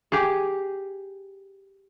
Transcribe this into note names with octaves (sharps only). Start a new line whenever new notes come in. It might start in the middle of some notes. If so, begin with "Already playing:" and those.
G4 G#4